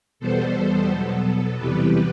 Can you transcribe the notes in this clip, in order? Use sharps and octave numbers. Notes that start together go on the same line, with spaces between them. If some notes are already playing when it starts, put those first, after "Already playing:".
E2 B2 G3 B3 A4 C5
B2 F#3 B3 A4
E2 C3 E3 G3 B3 G4 B4